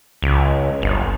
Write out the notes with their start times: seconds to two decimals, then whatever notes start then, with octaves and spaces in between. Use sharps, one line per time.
0.22 C#2
0.82 G1